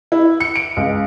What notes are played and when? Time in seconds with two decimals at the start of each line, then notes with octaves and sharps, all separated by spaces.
0.12 E4
0.40 C#7
0.56 D7
0.77 C#2